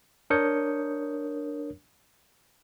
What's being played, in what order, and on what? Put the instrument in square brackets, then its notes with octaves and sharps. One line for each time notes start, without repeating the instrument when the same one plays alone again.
[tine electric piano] D4 A#4 C#5 D#6 G6 C#7